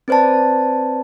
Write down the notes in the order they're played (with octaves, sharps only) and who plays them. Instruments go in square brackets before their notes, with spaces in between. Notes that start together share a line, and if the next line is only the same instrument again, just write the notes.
[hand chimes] C4 B4 C5 D5 A5